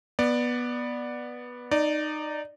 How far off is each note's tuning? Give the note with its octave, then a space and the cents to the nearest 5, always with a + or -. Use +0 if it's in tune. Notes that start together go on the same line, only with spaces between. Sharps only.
B3 -10 D5 +10
D#4 -20 D5 +0